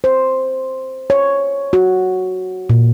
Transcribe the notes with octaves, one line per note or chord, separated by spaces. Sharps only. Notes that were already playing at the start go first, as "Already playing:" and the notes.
C5
C#5
F#4
A#2